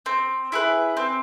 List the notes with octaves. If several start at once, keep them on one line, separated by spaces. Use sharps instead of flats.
C4
E4 G#4 B4
C4